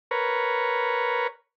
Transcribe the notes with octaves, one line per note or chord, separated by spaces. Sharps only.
A#4 B4 C#5